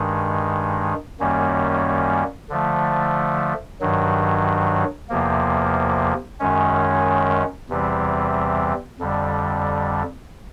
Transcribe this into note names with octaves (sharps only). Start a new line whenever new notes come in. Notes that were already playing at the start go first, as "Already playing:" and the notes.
Already playing: G2 D#3 G#3
F#2 D#3 G3 A#3 C#4
D3 F3 A3
G2 D#3 F#3
E2 C3 F3 A#3
F#2 D#3 G#3 C#4
E2 C3 E3 G3 C4
F2 D3 G3